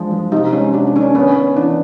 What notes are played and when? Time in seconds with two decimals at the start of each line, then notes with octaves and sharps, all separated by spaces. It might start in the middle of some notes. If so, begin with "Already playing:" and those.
Already playing: F3 G#3 D4
0.12 F3
0.32 C3 D#4
0.53 G#3 C#4
0.74 C3 D4
0.87 D4
0.95 D#3 C#4
1.01 D4
1.15 B3 C#4
1.35 B3
1.56 E3 D4